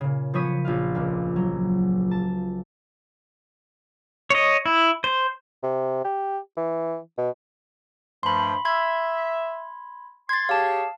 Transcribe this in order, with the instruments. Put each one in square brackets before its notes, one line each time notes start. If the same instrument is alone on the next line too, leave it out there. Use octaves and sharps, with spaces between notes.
[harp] A#2 C#3
F3 B3 C#4 C#5 D#6 B6
A#1 F4 F5
C#2 A#2
F#3
A5
[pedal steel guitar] C#5 D#5
E4
C5
[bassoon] C3
G4
E3
B2
[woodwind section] G2 F3 A3 [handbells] B5 C6
[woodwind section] E5 [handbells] B5 C6 G#6
[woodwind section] C6 [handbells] G#6 A6
[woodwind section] G4 G#4 C#5 [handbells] F5 A5